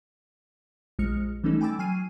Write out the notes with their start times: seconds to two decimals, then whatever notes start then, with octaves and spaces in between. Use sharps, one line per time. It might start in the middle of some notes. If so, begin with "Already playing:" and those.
0.99 A#1 G#3 F6 C#7
1.44 E3 G3 A3 C#4 D#4 A4
1.61 G5 G#5 B5 D6 E6 A6
1.79 F#3 G#5 F6 C7 D#7